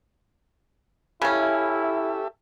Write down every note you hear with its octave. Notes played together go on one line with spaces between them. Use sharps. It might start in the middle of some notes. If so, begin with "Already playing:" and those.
C#3 C#4 E4 G4 A4 E5